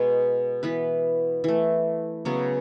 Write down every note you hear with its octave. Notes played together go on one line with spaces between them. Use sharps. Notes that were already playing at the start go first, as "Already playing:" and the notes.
Already playing: B2 G#3 B3 B4 C#5
E3 B3 B4
E3 A3
C#3 F#3 B3